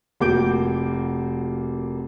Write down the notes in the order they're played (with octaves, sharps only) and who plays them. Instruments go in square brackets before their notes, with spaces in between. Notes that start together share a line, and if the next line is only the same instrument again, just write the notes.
[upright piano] F1 A#3 F#4 D6 G6 D7